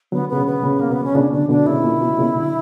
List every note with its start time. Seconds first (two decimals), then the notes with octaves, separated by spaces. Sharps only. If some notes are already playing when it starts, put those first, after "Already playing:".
0.12 D3 F#3 B3
0.29 C#3 B3
0.37 B2
0.47 B3
0.63 A#2 C#3
0.80 A#3
0.89 B2
0.92 B3
1.04 C#4
1.15 A#2 C#3 D4
1.32 B2 D3 D4
1.49 B2 D3 D4
1.66 A#2 C#3 E4
1.84 A#2
2.01 B2
2.18 A#2 C#3
2.36 B2 D3